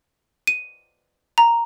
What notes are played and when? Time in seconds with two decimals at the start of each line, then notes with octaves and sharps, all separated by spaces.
0.47 D#7
1.38 A#5